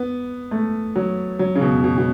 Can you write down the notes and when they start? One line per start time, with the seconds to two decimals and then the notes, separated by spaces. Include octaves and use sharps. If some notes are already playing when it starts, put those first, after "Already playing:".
Already playing: B3
0.51 A3
0.96 F#3
1.39 F#3
1.55 C#3
1.61 B2
1.84 B2
1.98 B2